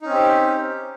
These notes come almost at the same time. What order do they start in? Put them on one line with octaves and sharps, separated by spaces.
D#4 C#4 C4 G4